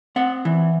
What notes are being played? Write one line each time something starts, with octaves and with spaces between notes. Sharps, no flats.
C4 F#5
E3